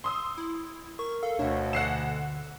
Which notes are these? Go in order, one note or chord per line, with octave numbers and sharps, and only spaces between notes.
C6 D#6 E6
E4
A#4 C#6
A4 F5
D2 B2 D4 C#5 E5 F#5
D3 F#5 E6 C7 E7